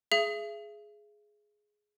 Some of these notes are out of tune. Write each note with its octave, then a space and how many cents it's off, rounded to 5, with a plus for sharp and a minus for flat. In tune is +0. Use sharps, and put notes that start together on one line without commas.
G#4 +10 E5 +40